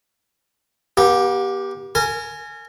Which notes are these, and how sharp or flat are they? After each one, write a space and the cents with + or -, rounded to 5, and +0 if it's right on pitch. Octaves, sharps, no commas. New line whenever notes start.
B3 -45 G4 +0
A#4 -35 G#5 +10